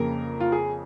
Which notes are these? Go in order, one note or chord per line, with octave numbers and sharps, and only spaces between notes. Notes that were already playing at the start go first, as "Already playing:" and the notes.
Already playing: F2 C#3 A#3 A#4
F4
G#4